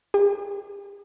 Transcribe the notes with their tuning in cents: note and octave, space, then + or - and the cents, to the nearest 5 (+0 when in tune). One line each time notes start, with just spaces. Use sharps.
G4 +45